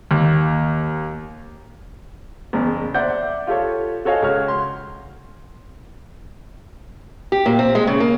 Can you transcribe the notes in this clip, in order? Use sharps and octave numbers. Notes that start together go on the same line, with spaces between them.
D#2
F#1 E2
C5 D5 E5 F#5 G6
F4 G4 A4 C#5
F#4 A4 C#5 D#5 F5 G#5
C#2 F#4 C#5 F6
C6
G4
A#2
C4
G#3
C#3
A#3